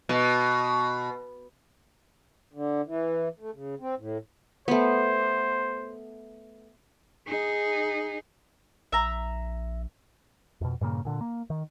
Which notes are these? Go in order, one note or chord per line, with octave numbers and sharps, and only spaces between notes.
B2
D3
E3
A3
C#3
C4
A2
A3 B3 C5
D#4 G#4
A#1 E5 A#5
F2 B2
G2 A#2 C#3 A#3
A#2 D3
A#3
D#3